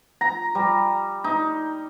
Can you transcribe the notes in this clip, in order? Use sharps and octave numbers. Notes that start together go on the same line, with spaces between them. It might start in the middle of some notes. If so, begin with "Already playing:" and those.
A#5
G3
D#4